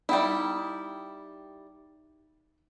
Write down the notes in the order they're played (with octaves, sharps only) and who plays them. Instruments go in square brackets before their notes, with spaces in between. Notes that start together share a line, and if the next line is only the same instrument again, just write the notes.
[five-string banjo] G3 E4 [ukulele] D#4 G5